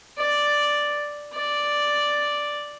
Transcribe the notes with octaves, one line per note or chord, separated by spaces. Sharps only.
D5
D5